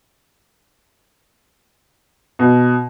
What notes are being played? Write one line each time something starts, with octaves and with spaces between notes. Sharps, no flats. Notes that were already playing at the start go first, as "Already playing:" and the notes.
B2